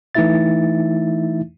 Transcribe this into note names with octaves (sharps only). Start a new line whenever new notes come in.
E3 A3 D#4 E4 E5 A6